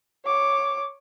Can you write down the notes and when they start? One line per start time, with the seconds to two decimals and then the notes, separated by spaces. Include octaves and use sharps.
0.25 C#5 D6